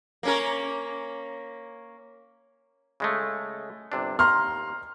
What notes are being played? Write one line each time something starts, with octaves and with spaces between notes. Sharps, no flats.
A#3 C#4 A#4
C#3 G#3 A3
G1 C3 D4
D#2 A#5 C6 F6